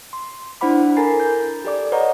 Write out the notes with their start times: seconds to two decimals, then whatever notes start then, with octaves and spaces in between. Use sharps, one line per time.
0.13 C6
0.61 D4 E4 C5 F#5 B5 D6
0.97 A4 A#4 G#5 A#5 A6 C7
1.20 G6
1.65 G4 A4 D5 D6
1.92 B4 C#5 D#5 F#5 A#5